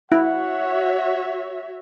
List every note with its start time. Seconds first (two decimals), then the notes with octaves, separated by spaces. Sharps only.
0.12 E4 F#4 C#5 E5 F#5